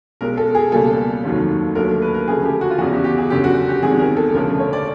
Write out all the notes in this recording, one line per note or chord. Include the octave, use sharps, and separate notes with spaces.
B1 B2 G#3 A#4
A4
G#4
C#2 B2 G3 A#3 A4
F1 D#2 D#3 F#3
D#2 D3 F#3 A3 A#4
B4
A#4
D2 C#3 F3 A3 G#4
G4
F#4
F4
E2 C#3 E3 F#4
G4
G4
G#4
F#1 F#2 D3 G4
F#4
G4
E2 C3 D#3 G#3 G#4
A#4
A4
E1 D2 C#3 F3 A3 A#4
C#5
D5